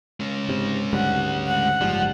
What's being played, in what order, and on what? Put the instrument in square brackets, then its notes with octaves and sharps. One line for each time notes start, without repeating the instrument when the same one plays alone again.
[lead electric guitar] G#3 C#4
[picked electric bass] G#2 C3
[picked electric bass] D2 G#2 G3 [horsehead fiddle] F#5
[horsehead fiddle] F#5
[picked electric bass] F#1 G#2 G3 [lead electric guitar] F3